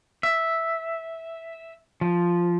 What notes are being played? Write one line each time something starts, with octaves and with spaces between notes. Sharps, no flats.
E5
F3